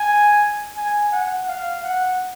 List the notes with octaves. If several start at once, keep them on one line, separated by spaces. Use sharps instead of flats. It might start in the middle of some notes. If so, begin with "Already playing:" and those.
Already playing: G#5
G#5
F#5
F5
F#5